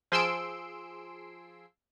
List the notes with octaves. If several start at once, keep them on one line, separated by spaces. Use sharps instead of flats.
F3 G#4 C6 E6 C7 D7